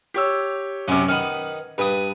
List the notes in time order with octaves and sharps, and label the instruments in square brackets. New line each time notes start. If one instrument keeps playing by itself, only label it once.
[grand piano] G4 C#5 E6
[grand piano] F#2 C3 [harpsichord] C#4
[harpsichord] D#3 B3 B5 [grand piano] F6 D#7
[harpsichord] G2 G5 D#6 [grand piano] B4